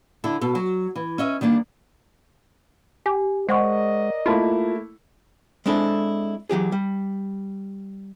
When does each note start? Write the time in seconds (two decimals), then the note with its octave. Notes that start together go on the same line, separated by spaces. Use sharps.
0.24 D3 E4 A4
0.41 B2 A4
0.55 F#3
0.96 E3
1.18 C#4 D#5 E5
1.41 D#3 G3 A#3 D4
3.06 G4 G#5
3.49 G#3 A#4 C5 D5 D#5 F#5 C#6
4.26 A3 A#3 E4 F4 A5 B5
5.66 G#3 C4 D4 E4 A4
6.50 E3 F#3 G4 G#4
6.72 G3